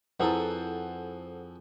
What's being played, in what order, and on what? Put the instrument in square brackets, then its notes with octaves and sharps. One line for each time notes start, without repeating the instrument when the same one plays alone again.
[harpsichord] F2 G#4 A4 [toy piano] E4 B4 [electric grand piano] C5 F#5